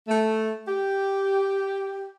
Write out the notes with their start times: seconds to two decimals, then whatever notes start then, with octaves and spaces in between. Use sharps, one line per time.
0.08 A3
0.68 G4